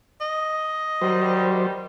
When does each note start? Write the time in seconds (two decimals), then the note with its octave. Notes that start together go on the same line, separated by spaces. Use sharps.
0.21 D#5
1.02 D#3 F#3 G3 C5